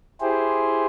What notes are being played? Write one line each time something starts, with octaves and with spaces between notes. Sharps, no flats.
E4 G4 G#4 C5